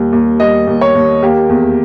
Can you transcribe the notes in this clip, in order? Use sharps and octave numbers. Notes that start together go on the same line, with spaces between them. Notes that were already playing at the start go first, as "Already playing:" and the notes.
Already playing: D#2 G3
D#2
G3 D#5
D#2
C#5
D#2
A#3 G4
E2